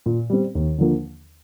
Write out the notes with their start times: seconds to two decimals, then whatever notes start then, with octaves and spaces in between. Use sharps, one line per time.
0.06 A#2
0.30 G3 C4
0.55 D#2
0.78 D3 F3 A#3